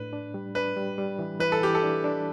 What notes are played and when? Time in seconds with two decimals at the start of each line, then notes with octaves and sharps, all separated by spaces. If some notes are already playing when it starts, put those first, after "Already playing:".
Already playing: A2 D4 B4
0.13 D4
0.34 G3
0.55 D4 B4
0.77 G3
0.98 G3
1.19 E3
1.40 E3 B4
1.52 A4
1.61 E3 G4
1.75 A4
1.83 D4
2.04 D4